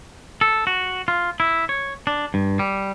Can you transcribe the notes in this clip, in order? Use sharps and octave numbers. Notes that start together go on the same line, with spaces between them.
A4
F#4
F4
E4
C#5
D4
G2
G3